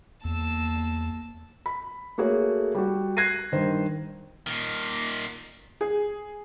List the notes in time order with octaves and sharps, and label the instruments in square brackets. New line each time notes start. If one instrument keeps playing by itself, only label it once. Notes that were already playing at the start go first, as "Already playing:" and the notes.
[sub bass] E2 [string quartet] A#3 A5 E6
[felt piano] B5
A3 A#3 F#4 G#4 C#5
G3 F#4
F#6 G#6 A#6 C7 D#7
G2 D#3 C5
[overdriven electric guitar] A#2 D#3
[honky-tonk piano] G#4